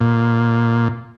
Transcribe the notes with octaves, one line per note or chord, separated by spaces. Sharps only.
A#2